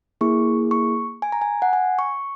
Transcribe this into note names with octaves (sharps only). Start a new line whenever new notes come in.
A#3 E4 G#4 C#6
C#6
G#5
A#5
G#5
F#5
G#5
C#6